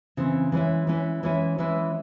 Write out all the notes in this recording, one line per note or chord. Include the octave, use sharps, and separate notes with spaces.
C#3 E3 C4
E3 G#3 C#4 E4
E3 G#3 C#4 E4
E3 G#3 C#4 E4
E3 G#3 C#4 E4